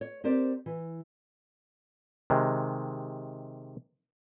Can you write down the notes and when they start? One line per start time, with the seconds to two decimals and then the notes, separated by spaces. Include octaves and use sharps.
0.01 C#5
0.24 C4 G4 A#4 C5 D5
0.66 E3
2.30 C3 D#3 G#3